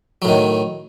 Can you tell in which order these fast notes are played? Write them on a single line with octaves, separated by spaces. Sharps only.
F#3 A2 D#3